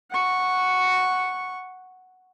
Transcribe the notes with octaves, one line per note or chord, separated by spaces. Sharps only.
F#5 C#6